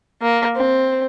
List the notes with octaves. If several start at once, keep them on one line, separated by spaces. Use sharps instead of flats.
A#3
C4